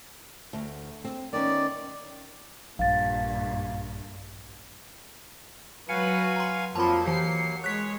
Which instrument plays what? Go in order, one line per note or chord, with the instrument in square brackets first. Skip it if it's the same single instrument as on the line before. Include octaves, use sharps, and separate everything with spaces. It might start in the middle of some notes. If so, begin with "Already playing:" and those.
[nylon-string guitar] D2
C4
[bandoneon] D#3 D5 [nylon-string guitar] B3 C#4
[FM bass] A#1 [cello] G2 A#2 [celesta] F5 A6
[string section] F#3 F#4 B4 [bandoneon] F5 G#5 [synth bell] C#7
[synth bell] A#5 C6
[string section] F2 F3 [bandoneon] F#3 A#3 [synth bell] A5 B5
[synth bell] E3 [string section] G4 C7 C#7
[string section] G#3 C#5 [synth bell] F#6 B6